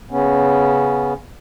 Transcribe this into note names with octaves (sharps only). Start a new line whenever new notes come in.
C#3 B3 C#4